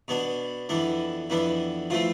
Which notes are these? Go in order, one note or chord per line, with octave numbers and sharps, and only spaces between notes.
B2 B3 D4
F2 E3 B3 D4
F2 E3 B3 D4
E3 F3 A3 C4 F4